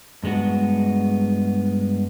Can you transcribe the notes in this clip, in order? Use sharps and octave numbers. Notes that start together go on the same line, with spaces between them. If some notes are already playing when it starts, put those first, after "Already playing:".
G2 G#3 B3 F#4